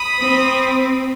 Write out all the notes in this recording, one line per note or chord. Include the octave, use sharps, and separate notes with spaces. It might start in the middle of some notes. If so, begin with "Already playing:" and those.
Already playing: B5 D#6
C4